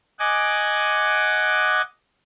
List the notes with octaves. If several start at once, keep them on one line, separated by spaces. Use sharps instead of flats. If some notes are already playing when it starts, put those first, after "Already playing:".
D#5 F#5 G#5 D6